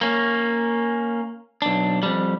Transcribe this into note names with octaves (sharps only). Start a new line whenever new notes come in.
A#3 C#4
B1 D4
F2 G3